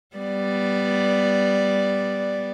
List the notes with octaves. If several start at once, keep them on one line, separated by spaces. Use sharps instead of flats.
G3 B3 D5